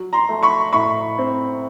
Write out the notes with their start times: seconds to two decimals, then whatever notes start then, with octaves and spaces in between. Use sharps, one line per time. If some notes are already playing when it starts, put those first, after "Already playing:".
Already playing: F#3
0.13 A#5 C6
0.29 A3
0.43 B5 C#6
0.73 A2 B5 C#6
1.18 C4